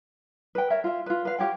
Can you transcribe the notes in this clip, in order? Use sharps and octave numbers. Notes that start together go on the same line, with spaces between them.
B4 G5
A#4 C#5 E5
F4 E5
F4 B4
B4 F5
F4 G4 C#5 G5